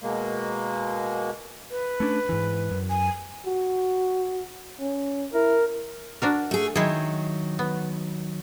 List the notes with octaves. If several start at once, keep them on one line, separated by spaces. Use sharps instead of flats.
B2 G#3 A#3
B4
A3 C#4 D4
G#2 E3
F#2
G#5
F#4
C#4
E4 A#4
D4 F#4 A#4
A3 G#4
D#3 F#3 G#3 E4 G#4
B3